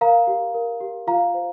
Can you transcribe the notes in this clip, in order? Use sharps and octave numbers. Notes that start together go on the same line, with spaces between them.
A#4 F5 A#5
G4
A#4
G4
F4 F5 A#5
C5